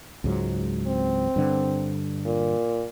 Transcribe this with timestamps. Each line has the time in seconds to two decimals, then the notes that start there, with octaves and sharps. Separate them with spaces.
0.24 C#2 G#2 F#3
0.87 C4
1.36 G2 D3
2.25 A#2